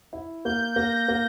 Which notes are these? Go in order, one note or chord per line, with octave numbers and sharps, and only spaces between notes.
E4
A#3 G6
A#3 A#6
A#3